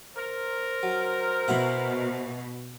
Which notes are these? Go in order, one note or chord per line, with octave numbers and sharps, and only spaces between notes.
A#4 C5
F#3
B2 E4 F#4 E5